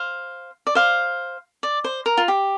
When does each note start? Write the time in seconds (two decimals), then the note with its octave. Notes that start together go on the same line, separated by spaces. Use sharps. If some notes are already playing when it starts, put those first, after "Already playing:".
Already playing: C5 F5
0.67 D5
0.75 C5 F5
1.63 D5
1.84 C5
2.06 A#4
2.17 F4
2.28 G4